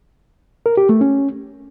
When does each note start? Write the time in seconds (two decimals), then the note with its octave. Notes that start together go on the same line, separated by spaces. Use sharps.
0.66 A#4
0.77 G4
0.89 A3
1.01 C#4